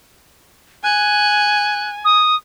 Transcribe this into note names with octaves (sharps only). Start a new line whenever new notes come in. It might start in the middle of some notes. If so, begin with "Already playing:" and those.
G#5 F#6
D#6